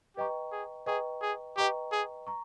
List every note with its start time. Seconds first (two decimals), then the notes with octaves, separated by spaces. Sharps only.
0.16 G4 B4 D#5 G5 A#5 C#6
0.52 G#4
0.86 G#4 B4 D#5 G5 A#5 C#6
1.22 G#4
1.57 G4 B4 D#5 G5 A#5 C#6
1.92 G#4
2.27 A#5 C#6